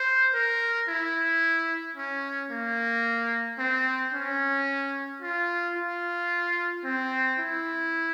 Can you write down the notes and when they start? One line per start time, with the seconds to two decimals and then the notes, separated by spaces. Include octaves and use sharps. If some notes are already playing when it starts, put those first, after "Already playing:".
Already playing: C5
0.34 A#4
0.88 E4
1.96 C#4
2.51 A#3
3.59 C4
4.13 C#4
5.22 F4
5.76 F4
6.85 C4
7.39 E4